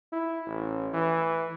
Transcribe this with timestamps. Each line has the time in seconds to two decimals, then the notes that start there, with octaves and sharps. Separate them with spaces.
0.12 E4
0.46 A1
0.94 E3